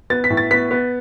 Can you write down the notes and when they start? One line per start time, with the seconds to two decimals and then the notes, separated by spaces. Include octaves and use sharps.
0.10 B3 A6
0.24 B6
0.30 A2
0.37 A6
0.51 B3 B6
0.71 B3